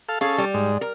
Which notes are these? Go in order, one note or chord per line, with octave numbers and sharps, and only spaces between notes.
A4 F5
C#4 G#4 A4 F5
G3
G#2
A#4